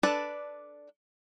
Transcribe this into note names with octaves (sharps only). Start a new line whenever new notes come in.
D4 A4 B4 D5